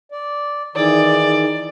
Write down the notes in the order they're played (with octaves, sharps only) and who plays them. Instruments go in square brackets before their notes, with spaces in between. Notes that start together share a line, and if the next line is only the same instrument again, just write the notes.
[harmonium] D5
[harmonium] D#3 E3 [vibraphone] D#4 E4 G#4 [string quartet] D5